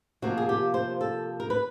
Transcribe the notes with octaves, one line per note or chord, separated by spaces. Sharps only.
C3 F3 A#3 F#4
G#4
G4
C5
A4
A#4
B4